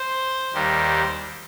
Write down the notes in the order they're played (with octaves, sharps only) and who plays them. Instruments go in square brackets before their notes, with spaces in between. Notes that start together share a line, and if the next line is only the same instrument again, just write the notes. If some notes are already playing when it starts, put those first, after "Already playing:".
Already playing: [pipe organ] C5
D#2 D#3 G3